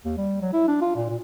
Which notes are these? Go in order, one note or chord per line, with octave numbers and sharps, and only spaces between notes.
D#2
G3
F#3
E4
D4
F4
A#2
A#2